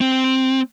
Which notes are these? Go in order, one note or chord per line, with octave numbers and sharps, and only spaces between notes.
C4